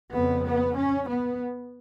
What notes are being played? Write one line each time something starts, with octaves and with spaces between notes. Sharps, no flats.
F2 C#3 B3
B3
C#4
B3